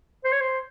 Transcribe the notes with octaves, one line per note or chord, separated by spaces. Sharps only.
C5
C#5
C5